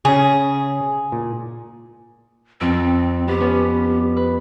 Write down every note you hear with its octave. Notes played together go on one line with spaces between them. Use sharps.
C#3 C#4 G#4
A#2
F2 C4
B3 G4
B3 C#4
B4